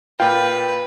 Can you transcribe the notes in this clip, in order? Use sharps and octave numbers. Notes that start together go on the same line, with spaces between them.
A#2 F4 B4 G5